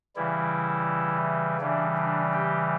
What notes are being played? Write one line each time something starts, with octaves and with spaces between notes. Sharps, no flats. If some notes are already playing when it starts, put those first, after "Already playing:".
C#3 E3 G3 E4
C#3 E3 G3 D4
D4
G4